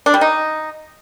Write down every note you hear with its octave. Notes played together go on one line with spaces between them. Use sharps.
D4
G3
D#4